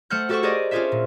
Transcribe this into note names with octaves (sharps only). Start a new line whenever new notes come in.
A3 C5 F#5 F6 G6
F#4 G4 A4 C5 F#5 C#6
G4 G#4 A#4 C5 D5 D#5
C#4 D4 F4 G#4 C5 E5
A#2